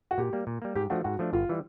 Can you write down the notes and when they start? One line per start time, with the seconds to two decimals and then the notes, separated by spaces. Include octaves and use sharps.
0.11 F#4
0.18 A#2 G4
0.33 G3 A#3
0.47 A#2
0.62 G3 A#3
0.75 G#2 G4
0.90 F3 A3 D4 F#4
1.04 G#2 F#4
1.19 F3 A3 D4
1.33 G1 F4
1.49 E3 G3